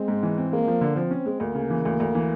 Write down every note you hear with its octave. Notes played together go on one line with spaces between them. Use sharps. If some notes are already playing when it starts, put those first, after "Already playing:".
Already playing: G#3 C4
G#2
E3
C4
G#3 A#3
F3
D3
F3 C4
C#4
G#3
D2 A#3
C#3
E3
D2
D2
E3